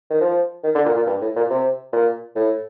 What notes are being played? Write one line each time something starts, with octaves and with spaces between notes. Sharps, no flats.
D#3
F3
D#3
D3
A#2
A#2
G2
A2
A#2
C3
A#2
A2